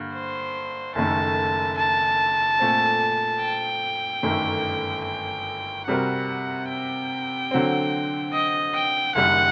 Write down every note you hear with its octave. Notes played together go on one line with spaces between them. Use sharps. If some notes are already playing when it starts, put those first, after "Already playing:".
Already playing: G2 D3 A#3
C5
F#1 F#2 D#3 A3 A5
A5
A#2 A3 C4
G5
G1 F#2 D#3 A3
G5
C3 G3 C4 F#4 A#4 F#5
G5
D3 F#3 C4
D#5
G5
F#1 F#2 D#3 G3 F#5